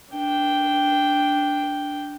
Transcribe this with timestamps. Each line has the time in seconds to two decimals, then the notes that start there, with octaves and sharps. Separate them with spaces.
0.12 D4 G5